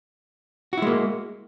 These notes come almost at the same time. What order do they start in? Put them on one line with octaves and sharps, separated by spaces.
F#4 E4 G#3 A#3